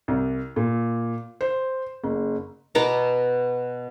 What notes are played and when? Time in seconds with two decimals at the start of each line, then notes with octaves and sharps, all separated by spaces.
0.08 C2
0.56 A#2
1.41 C5
2.04 F#1
2.75 B2 B3 A#5 D6